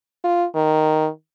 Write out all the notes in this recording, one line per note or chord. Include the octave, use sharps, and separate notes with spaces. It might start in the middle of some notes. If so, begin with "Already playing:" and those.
F4
D#3